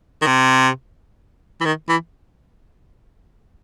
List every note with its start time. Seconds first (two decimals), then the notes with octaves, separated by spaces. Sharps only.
0.22 D#3
0.27 C3
1.61 E3
1.65 D#3
1.89 E3